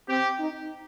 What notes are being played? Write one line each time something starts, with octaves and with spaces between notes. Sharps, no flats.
C4 G4
D#4